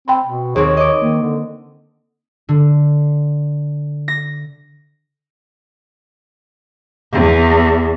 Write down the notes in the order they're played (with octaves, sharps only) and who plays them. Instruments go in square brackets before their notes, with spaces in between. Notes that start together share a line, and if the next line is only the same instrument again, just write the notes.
[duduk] C4 [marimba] G5 B5 C6
[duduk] B2
[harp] D#2 C4 [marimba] G#4 [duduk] C#5
[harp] D#5 D6
[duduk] D#3 [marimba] A#3
[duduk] D3
[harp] D3
A#6
[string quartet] E2